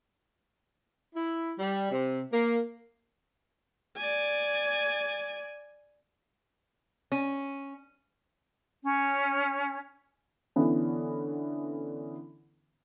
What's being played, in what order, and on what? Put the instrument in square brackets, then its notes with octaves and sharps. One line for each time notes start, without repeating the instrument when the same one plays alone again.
[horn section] E4
G3
C3
A#3
[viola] D5 G#5
[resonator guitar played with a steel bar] C#4
[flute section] C#4
[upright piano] D3 E3 B3 C#4